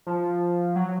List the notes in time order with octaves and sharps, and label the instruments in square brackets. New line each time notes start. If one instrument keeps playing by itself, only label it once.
[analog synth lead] F3
F#3